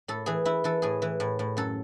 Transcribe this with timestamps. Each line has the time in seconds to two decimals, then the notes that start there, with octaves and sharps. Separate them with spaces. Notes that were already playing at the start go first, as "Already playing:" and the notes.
0.08 A2 A4
0.26 E3 G#4
0.45 E3 E4
0.64 E3 A4
0.82 A2 G#4
1.02 E3
1.20 A2
1.39 A2
1.57 F#2 A4